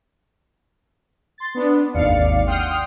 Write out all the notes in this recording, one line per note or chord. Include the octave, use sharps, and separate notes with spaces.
C6 A6
B3 D4
G#1 D#2 D5 F5 C#7
F#5 G5 C6 D#6 F6